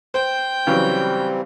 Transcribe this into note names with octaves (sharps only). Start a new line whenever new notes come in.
C5 G5
C#3 E3 F#3 G3 C4